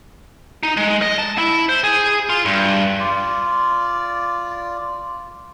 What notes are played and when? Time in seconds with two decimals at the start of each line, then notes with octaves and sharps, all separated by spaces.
0.63 D#4
0.77 G#3
1.02 D#5
1.18 A5
1.38 E4
1.69 C5
1.84 G#4
2.30 F4
2.45 G2
3.00 F4 D5